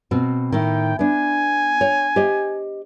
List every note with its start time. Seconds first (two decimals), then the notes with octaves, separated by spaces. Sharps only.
0.11 B2 C4 F#4
0.52 A2 D#3 G5
0.99 B3 D4 G#5
1.81 C#5
2.16 G4 C5 D#5